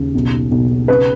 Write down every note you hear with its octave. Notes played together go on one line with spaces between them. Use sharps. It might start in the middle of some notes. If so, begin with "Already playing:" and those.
Already playing: D#2 C#3
B1
B1
C#3 B4